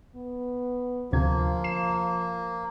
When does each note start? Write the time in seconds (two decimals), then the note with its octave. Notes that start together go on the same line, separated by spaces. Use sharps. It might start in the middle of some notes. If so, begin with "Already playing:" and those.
0.16 B3
1.12 D2 C3 F3 A#3 G#6
1.64 C7 E7